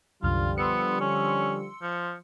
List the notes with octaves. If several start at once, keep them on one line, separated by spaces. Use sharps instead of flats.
C2 F#2 D3 F3 G3 F4 F6
B3 C6 E6 C#7
C#4
F3